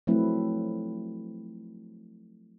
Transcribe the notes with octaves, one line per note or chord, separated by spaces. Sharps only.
F3 F#3 A3 C4 E4 B4